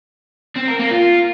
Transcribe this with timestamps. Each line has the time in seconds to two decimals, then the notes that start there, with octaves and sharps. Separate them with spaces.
0.56 C4
0.67 A#4
0.79 A#3
0.91 F4